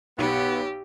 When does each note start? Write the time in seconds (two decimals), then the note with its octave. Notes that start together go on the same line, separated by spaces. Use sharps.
0.18 B1 B3 G4